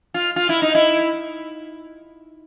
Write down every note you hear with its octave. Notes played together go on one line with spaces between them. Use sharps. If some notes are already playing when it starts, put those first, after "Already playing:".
F4
F4
E4
D#4
E4